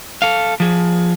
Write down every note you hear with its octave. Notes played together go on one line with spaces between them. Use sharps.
A4 F5
F3 G#4